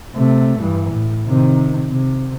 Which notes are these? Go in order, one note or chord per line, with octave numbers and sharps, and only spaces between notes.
C3 A3
G2 E3
A2
C3 D#3
C3